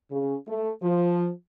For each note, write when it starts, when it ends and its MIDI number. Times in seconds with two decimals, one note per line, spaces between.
0.11 0.35 49
0.48 0.70 57
0.83 1.29 53